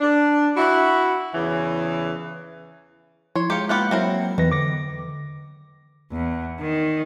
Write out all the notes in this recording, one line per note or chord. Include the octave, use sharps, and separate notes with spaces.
D4
E4 F#4
E2 C#3 E3
F3 E4 C#5 C6
G#3 F4 G4 A#5 C#7
A#3 B3 F4 G4 B5 F#6
F#3 C4 E4 A#4
E2 D#3 E3 B4 A#6
D3 D6 A#6
E2
D#3